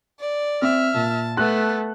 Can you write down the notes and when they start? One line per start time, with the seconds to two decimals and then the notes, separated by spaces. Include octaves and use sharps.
0.19 D5
0.62 C4 E5 F6
0.94 A#2 A5
1.37 A3 B3 A4 F#6